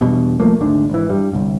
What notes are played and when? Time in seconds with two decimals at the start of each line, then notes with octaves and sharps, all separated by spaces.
0.01 E2 G2 B2
0.40 C2 F3 A3 A#3
0.61 G#1 D2 G#2 D4
0.90 G#1 E3
1.09 G2 G3
1.33 G1 C2